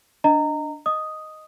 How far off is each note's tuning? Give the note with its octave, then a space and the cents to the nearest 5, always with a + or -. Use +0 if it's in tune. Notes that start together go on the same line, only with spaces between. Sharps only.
D4 +0 D#5 +0 A#5 -20
D#5 +0 D#6 +0